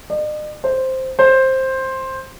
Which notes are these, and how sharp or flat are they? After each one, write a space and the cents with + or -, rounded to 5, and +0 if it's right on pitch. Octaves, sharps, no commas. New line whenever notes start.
D#5 -45
C5 +0
C5 +10